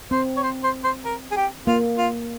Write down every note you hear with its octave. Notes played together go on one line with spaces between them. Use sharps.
C4 C5
C#5
C5
C5
C5
A#4
G#4
G4
A#3 F4
F4